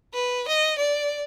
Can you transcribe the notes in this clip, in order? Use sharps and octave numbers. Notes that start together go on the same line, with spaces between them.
B4
D#5
D5